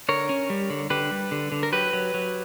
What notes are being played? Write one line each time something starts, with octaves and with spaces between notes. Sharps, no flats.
D3 A#4 C#5
C#4
G3
D3
D3 G4 B4
G3
D3
D3
A#4
F#3 G4 B4
F#3
F#3